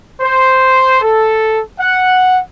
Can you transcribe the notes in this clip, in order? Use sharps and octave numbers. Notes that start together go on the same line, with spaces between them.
C5
A4
F#5